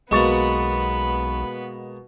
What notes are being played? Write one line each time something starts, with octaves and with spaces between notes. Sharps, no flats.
B1 B2 G#3 A#3 B3 B5 C#6 A6